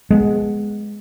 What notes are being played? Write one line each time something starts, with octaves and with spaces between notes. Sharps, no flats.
G#3 B3